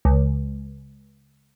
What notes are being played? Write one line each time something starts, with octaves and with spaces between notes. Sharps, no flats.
C#2